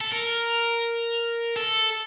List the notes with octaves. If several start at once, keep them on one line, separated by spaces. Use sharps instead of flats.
A4
A#4
A4